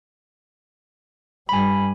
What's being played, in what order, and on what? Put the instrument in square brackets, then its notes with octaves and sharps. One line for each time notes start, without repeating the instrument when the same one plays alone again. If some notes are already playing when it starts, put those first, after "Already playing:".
[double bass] G2 G3 [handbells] G#5 B5